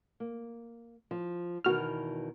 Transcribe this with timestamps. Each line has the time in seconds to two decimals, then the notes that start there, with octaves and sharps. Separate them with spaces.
0.20 A#3
1.11 F3
1.64 E2 B2 D#3 F#4 F6